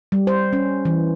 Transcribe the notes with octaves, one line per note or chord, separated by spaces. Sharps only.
G3
C5
C#4
E3